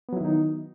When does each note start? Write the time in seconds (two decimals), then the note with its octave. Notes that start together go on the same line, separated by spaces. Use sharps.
0.09 B3
0.13 F#3
0.17 E4
0.21 D#3
0.25 D#4